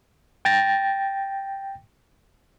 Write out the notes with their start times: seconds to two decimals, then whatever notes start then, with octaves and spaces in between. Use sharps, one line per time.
0.45 G5 A6 A#6